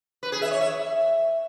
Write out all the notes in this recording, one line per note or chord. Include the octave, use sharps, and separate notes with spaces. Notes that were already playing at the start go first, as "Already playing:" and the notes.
B4
G#4
E5
C#5
E5